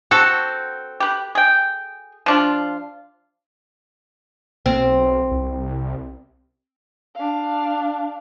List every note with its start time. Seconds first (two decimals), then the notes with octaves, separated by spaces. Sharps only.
0.11 C4 F#4 A4
1.00 G4 B4
1.35 G#4 G5
2.26 F3 D4 F4
4.66 B1 C4
5.31 C2
7.15 D4 F5